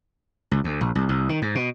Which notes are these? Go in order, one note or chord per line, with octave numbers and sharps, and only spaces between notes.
C#2
D2
A#1
C2
C2
D#3
G#2
B2